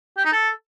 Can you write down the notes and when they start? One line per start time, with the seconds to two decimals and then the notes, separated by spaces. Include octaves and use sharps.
0.18 G4
0.25 D#4
0.32 A4